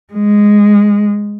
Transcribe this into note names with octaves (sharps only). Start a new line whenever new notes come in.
G#3